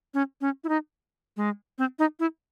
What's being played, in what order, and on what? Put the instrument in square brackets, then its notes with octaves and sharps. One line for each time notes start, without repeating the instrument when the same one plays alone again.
[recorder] C#4
C#4
E4
D#4
G#3
C4
D#4
E4